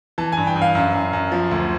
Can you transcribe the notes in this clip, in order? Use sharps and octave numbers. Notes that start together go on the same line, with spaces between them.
E3 A5
G2 G#5
G5
G2
F5
F#2
F#2
F#2
F3
D2